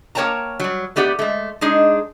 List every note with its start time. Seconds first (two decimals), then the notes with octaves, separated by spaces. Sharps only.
0.15 A#3 A#4 C#5 G5 A5 A#5
0.60 F#3 G3
0.96 A3 B3 G4 D5 F#5
1.19 G#3 A3
1.61 G#3 D4 D#4 G#4